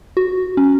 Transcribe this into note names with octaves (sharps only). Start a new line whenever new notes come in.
F#4
C#4